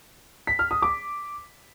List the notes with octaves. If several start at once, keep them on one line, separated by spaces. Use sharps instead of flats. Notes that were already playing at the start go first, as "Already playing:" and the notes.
B6
F6
D#6
D6